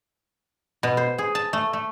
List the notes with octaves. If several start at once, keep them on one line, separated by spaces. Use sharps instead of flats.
B2
C5
G#4
A5
A3
A3